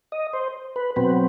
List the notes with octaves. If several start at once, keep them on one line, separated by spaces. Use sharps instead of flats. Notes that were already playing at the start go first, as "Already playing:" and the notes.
D#5
C5
B4
B2 F#3 C4 B4